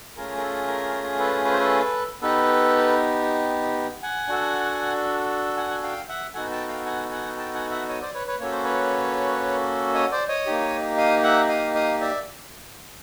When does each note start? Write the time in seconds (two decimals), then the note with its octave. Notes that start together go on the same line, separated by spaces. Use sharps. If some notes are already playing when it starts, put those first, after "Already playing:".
0.16 A3 C#4 F4 G#4 A#4
0.37 A#4
0.42 A4
0.68 A#4
1.19 A4 B4
1.45 B4
1.52 C5
1.60 A4 B4
2.22 B3 D#4 G4 A4 B4
4.02 F#5 G#5
4.28 D4 F#4 A4
5.57 F#5 G#5
5.71 G#5
5.83 F5 G5
6.08 E5 F#5
6.34 B3 D#4 F#4 A4 F#5 G#5
6.52 G5 A5
6.68 F5 G5
6.85 F#5 G#5
7.11 F#5 G#5
7.37 G5 A5
7.54 F#5 G#5
7.71 E5 F#5
7.89 C#5 D#5
8.01 C5 D5
8.14 B4 C#5
8.27 B4 C#5
8.40 A#3 C#4 F#4 A4 C#5
8.52 C5
8.64 B4 C#5
9.94 C#5 D#5
10.12 C5 D5
10.29 C#5 D#5
10.46 A#3 D#4 G4
10.97 D#5 F5
11.23 E5 F#5
11.49 D#5 F5
11.75 D#5 F5
12.00 D5 E5